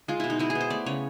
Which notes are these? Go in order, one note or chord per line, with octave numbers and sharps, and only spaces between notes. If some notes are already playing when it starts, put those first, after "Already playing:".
G#3 F4
B2 E4
D#4
G#3 E4
G#4
B3
C5
A3 D5
C#3 C#5